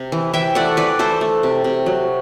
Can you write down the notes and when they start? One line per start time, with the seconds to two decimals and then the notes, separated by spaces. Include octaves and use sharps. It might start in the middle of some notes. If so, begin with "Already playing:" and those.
Already playing: C3
0.12 E3
0.34 E3 E5 G5
0.55 A3 D5 F#5
0.77 E3 B4 D5
0.99 A3 A4 C5
1.21 A3
1.43 C3
1.64 C3
1.86 F#3